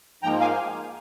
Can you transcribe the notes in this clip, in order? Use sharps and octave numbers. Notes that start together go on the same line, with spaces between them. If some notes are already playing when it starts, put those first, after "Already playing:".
G#2 F3 A#3 G5 A#5
F5 G#5